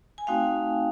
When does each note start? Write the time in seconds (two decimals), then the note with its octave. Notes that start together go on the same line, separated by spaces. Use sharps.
0.18 G#5
0.27 A3 C4 D#4 F#4 F5 G5